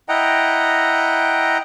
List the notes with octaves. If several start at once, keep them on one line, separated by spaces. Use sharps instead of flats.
E4 D#5 F#5 G5 A#5